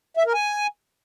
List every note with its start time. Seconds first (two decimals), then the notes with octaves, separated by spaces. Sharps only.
0.17 E5
0.26 A#4
0.34 G#5